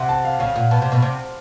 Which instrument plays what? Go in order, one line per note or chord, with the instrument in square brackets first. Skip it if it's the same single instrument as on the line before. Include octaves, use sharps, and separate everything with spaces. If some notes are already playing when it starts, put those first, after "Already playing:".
Already playing: [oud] C3 [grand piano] E5 F#5
[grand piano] A5
F5
[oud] C#3 [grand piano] F5
[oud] A#2 [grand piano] F#5
[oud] B2 [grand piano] A5
[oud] C3
B2
C3